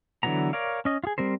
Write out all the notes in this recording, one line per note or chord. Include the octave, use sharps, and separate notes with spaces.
D3 E3 F#3 B3 A#5
A#4 C#5 D5 F5
C#4 D#5
F4 G#4
G3 C4 A#4 C5